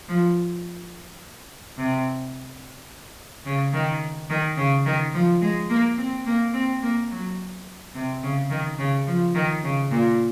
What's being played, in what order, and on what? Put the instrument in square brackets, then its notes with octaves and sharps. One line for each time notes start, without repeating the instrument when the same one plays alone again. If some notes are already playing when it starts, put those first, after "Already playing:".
[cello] F3
C3
C#3
D#3
D#3
C#3
D#3
F3
G#3
A#3
C4
A#3
C4
A#3
F#3
C3
C#3
D#3
C#3
F3
D#3
C#3
A#2